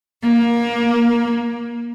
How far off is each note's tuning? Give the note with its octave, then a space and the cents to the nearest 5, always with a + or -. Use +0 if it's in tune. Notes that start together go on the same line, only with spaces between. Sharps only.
A#3 +20